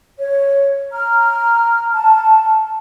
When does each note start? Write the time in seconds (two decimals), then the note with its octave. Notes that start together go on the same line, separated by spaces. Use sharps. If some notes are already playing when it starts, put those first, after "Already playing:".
0.18 C#5
0.92 A#5 F6
1.92 A5